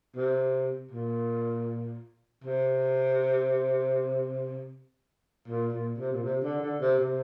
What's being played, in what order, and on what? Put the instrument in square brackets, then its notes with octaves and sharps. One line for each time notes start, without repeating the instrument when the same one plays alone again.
[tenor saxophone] C3
A#2
C3
A#2
A#2
C3
A#2
C3
D3
D3
C3
C3